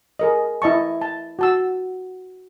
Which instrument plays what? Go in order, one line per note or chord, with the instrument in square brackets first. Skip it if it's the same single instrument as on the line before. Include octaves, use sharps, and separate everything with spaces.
[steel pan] G#4 A#4 D#5
E4 D#5 A5 C#6
A5
F#4 A5 E6